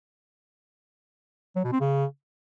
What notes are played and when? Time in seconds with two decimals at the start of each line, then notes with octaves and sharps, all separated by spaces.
1.56 F#3
1.64 B2
1.72 C4
1.81 C#3